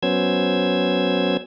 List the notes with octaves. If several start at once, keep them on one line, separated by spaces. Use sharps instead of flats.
F#3 B3 C#4 C5 E6 G#6